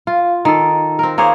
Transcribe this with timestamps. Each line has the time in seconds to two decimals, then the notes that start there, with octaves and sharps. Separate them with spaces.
0.07 F4
0.45 D#3 A4
0.99 C4 A#4
1.18 A#3 G#4 C5 C#5